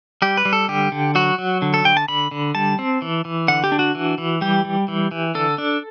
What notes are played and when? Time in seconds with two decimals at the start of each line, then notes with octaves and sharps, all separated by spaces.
0.22 G3 G4
0.37 B4
0.45 G3
0.53 A4
0.68 D3 G4
0.92 D3
1.15 F#3 F#4
1.38 F#3
1.62 D3
1.74 A4
1.85 D3 G5
1.97 A5
2.08 D3 B5
2.31 D3
2.55 G3 A5
2.79 C4
3.02 E3
3.25 E3
3.48 D3 F#5
3.64 G4
3.72 D4
3.79 F#4
3.95 E3
4.18 E3
4.41 G3 G4
4.65 G3
4.88 E3
5.11 E3
5.35 D3 A4
5.58 D4